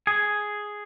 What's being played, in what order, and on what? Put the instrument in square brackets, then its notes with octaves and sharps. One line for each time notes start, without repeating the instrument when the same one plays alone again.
[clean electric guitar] G#4